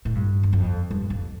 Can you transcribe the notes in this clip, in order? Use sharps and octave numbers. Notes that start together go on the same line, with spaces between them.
A2
G2
E2
F2
G2
F2